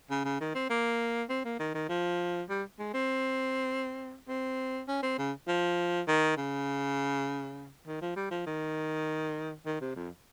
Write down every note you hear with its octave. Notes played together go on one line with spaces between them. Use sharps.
C#3
C#3
D#3
C4
A#3
C4
A#3
D#3
D#3
F3
G3
G#3
C4
C4
C#4
C4
C#3
F3
D#3
C#3
D#3
F3
G3
F3
D#3
D#3
C3
F2